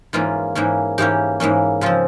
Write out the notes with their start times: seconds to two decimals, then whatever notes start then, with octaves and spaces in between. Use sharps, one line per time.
0.13 G#2 E3 A#3 C#4 F4
0.55 G#2 E3 A#3 C#4
0.98 G#2 E3 A#3 C#4 G4
1.40 G#2 E3 A#3 C#4
1.81 C#3 F3 C4 F4